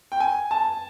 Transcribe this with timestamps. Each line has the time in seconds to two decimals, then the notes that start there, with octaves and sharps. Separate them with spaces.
0.12 G5
0.20 G#5
0.51 A5